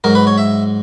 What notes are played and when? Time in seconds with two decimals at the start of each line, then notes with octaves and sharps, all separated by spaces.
0.04 G#2 F#3 A#4
0.15 B4
0.27 C#5
0.38 E5